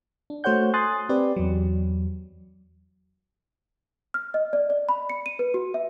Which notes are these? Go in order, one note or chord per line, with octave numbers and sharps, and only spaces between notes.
D4
A3 F#4 C5 C#5 F#5 G6
G#5 C6 D#6 F#6 A6
C4 G4 B4 D5
E2 F#3
F6
D#5
D5
D5
B5
C#7
D#7
B4
F#4
E5